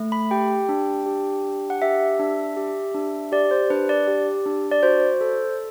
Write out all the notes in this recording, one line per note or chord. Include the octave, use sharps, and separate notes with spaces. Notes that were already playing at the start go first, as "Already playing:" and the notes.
Already playing: A3
B5
G4 G5
D4
G4
D4
F#5
G4 E5
D4
G4
D4
G4 D5
C5
D4 B4
D5
G4
D4
D5
F#4 C5
A4